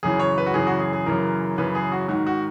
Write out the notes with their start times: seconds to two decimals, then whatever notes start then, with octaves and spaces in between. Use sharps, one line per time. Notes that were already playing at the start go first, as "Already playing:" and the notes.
0.03 F#2 C#3 E3 G#4
0.20 C#5
0.38 B4
0.46 F#4
0.54 F#2 C#3 E3 G#4
0.67 F#4
0.80 G#4
0.93 G#4
1.06 F#2 C#3 E3 A#4
1.58 F#2 C#3 E3 B4
1.75 G#4
1.92 F#4
2.08 G#2 D#3 F#4
2.27 F#4